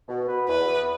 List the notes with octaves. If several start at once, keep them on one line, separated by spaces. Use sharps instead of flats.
B2
B3 F#4 B4
E2 B4
E3 B3